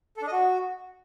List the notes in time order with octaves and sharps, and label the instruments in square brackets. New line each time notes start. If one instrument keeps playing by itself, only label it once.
[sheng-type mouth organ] A4
D4
D#5
F#4